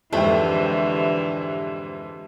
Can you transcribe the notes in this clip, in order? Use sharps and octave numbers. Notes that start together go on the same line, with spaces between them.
F2 G#2 D3 E3 A3 G4 E5 G5